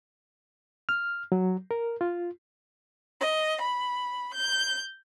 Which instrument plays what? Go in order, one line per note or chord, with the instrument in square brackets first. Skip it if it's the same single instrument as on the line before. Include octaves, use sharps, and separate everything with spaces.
[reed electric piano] F6
F#3
A#4
F4
[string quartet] D#5
B5
G6